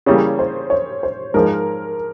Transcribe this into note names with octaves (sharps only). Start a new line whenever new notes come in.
C#3 E3 G3 A#3 C#5
C5
C#5
C5
G#2 F3 G#3 A#4